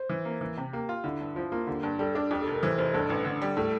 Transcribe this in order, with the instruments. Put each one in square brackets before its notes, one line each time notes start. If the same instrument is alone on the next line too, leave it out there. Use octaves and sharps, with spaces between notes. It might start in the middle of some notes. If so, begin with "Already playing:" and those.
Already playing: [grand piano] C5
[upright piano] E3
A#3
E3
C3
[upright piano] A#3 [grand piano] G4
[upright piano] F4
[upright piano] D3 [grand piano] E4
[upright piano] G2
[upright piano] F3 [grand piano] F4
[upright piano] A#3 [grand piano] F4
[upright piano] D3 [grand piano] G4
[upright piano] G2
[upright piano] G3 [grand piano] A4
[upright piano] D4 [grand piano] A4
[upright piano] F2 [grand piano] G4
[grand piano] A4
[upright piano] F1 [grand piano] A#4
[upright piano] E3 [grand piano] C5
[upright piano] F1 [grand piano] C5
[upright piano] G2 [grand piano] A4
[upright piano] A1
D3
G3
[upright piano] A2 [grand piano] A4